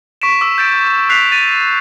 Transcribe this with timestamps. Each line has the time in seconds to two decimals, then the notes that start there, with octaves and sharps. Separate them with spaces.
0.22 C#6 B6 D7 E7
0.41 D6 E6 B6
0.58 G6 A6 D7
1.09 F#6 B6 C7 F7
1.32 A6 D#7